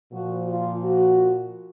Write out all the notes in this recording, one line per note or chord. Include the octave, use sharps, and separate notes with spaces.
A#2 F3 F#4
F4
F#4